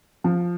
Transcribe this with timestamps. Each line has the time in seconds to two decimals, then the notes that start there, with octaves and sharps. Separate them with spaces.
0.24 F3